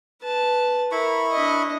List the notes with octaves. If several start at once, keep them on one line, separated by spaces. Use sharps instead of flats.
B4 A5
E4 A#4 B5 C#6
D4 D#5